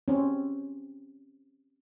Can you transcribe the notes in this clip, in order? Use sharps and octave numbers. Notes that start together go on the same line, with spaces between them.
C4 C#4